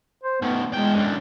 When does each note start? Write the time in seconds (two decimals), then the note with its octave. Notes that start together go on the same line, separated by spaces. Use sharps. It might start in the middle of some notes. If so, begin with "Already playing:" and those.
0.24 C5
0.42 D#3 A3 B3
0.73 E2 G#3 G5
0.94 F#2 D3